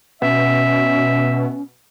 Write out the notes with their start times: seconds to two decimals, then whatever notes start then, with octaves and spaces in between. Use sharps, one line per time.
0.22 B2 C#4 E5